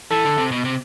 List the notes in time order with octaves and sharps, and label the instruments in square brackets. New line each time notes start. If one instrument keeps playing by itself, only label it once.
[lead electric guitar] E3 [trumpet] A4
[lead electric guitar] D3
C3
B2
C3